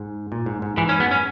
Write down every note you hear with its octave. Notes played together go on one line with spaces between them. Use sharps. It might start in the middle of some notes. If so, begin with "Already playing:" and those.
Already playing: G#2
A#2
G#2
G#2
G#2 E3
C#4
F#2 B3
C#4